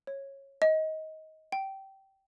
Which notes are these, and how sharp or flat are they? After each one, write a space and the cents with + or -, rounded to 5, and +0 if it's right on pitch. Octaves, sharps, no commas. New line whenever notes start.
C#5 -15
D#5 +20
G5 -20